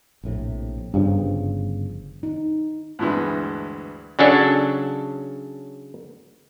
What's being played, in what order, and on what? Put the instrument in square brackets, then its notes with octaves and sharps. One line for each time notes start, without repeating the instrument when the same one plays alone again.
[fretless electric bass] A#1 A2 C3
[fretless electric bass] G1 C#3 F3 [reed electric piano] G2
[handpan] D#4
[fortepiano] D2 G2 E3 G#3 B3
[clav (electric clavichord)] C#3 F#3 C#4 D4 A4